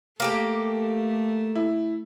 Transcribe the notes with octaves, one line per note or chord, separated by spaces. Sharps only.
A3 A#3 G4 A4
E4